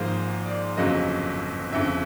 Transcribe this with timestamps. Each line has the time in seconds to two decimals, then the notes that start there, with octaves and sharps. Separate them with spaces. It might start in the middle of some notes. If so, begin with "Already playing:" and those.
Already playing: G#1 G#2 F3 A#3 C5
0.46 D5
0.77 G1 F2 C#3 F#3 A#3 D#5
1.72 G1 F2 C#3 E5